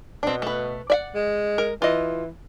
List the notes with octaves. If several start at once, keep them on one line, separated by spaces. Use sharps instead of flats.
B2 C4 D4
A3 B4
D5 E5 F#5
G#3
A#4
E3 F4 D#5